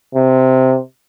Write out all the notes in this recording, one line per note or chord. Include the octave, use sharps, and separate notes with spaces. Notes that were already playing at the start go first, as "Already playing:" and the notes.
C3